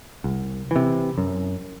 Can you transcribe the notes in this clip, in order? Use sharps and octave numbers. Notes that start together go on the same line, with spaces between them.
C2
C3 E3
F#2